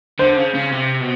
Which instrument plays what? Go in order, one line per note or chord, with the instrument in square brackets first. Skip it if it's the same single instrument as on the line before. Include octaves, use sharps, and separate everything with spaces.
[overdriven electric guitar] D3 [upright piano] C5
[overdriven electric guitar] C#3
C#3
C3
B2